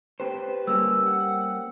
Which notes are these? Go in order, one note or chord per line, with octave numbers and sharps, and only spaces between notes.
B3 G4 B4 C5
G3 A#3 C#4 E6
F#5